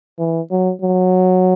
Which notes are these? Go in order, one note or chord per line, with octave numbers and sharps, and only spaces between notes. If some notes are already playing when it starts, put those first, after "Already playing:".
E3
F#3
F#3